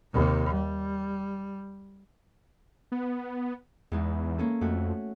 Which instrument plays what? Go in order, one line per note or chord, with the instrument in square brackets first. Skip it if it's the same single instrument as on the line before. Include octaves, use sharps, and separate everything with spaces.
[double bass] D#2 C3
G3
[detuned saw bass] B3
[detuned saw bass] E2 [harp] G#2 E3 G#3
[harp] A#3 C#4 A4
[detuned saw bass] F2 [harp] A3 F#4